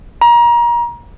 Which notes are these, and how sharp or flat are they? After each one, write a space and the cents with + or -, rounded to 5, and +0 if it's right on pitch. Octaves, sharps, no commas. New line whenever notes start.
A#5 +30